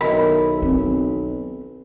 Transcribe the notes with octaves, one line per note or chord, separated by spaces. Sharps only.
B1 D#3 E4 B5
C4